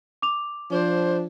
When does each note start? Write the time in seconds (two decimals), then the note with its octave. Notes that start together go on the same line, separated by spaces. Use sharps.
0.22 D6 F7
0.71 F3 D4 C5